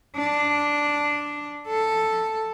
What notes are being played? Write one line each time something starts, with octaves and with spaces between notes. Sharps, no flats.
D4
A4